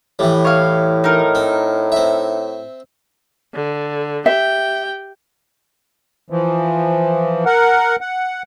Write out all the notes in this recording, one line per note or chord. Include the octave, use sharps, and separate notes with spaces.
A2 E3 G3
C#5 F5
D#4 A#4
C4
C4 E5
D3
G4 E5 G5
E3 F3
A#4 F#5
F#5